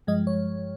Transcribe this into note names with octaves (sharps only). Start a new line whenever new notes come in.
G2 F3 G#3 D#5
C#5